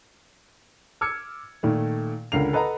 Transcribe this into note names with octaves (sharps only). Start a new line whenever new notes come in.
D6 E6 F6 G#6 C#7
A#2 D#3 A3
C#2 D3 A#4 C7 F7
A4 B4 D#5 F#5 A#5